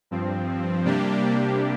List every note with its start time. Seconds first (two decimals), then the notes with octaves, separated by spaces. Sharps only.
0.11 G2 F3 C4
0.85 C3 G3 A#3 D4 G4